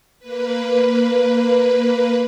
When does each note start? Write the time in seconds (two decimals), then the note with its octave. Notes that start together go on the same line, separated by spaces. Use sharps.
0.19 A#3 B4